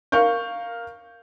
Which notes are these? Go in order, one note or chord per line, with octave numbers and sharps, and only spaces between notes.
A#4 F5 C#6 G6